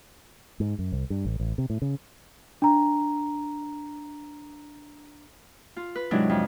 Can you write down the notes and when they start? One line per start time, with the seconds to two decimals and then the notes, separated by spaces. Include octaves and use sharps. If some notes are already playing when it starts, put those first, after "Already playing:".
0.60 G#2
0.79 F#2
0.92 C2
1.10 G2
1.25 A1
1.40 A1
1.58 C3
1.70 A2
1.82 C#3
2.62 D4 A#5
5.76 F4
5.95 B4
6.11 G#2 C3 F#3 G#3 D4 E4
6.29 F2